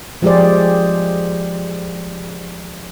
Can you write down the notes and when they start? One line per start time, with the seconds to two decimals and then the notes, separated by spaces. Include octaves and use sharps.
0.22 F3 G#3 G4 G#4 C5 D5